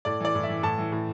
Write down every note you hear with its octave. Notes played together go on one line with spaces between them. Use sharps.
A2 D5
E3 D5
A2
E5
E3
A2 A5
E3
A2